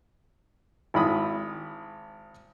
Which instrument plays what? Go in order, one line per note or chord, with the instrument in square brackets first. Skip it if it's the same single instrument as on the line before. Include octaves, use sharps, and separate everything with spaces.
[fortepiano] G#1 E4 B5 D#6